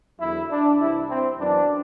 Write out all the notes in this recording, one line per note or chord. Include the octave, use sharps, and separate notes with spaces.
E2 D3 F#3 E4
D4
C2 C3 E3 G3 E4
C4
F#2 E3 B3 D4